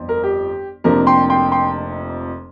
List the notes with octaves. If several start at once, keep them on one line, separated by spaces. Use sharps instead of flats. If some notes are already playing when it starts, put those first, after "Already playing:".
Already playing: G1 F2
A#4
G4
F1 F2 C3 A#3 D4 A#4
G5 C6
G5 C6
G5 C6